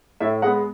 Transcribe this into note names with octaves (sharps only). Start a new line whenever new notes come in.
A2 E5
G#3 B3 F#5